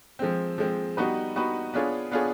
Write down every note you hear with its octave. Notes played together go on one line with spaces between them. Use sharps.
F3 G#3 C4
F3 G#3 C4
G3 B3 D#4 F#4 B4
G3 B3 D#4 F#4 B4
B3 D4 F4 G#4 C#5
B3 D4 F4 G#4 C#5